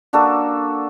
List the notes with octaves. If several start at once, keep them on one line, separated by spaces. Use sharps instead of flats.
A#3 D4 F#4 A4